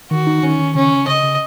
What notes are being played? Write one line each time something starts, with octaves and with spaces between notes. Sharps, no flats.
D#3 F#4
D#4
D#3 C#4
D#3
C#3 C#4
C#3
C#3 D#5
C#3